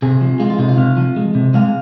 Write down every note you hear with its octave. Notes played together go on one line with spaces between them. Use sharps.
C3 G#4
F3
G#3 F4
F4
C3 D#4
F4
C3 F5
F3
G#3
C3
G#3 F5